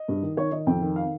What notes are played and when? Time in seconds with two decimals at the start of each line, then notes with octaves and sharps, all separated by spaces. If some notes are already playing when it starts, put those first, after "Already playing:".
Already playing: D#5
0.08 G2
0.22 D#3
0.37 D#3 C#5
0.52 D#3 D#5
0.67 F2 G5
0.82 D#3
0.96 F5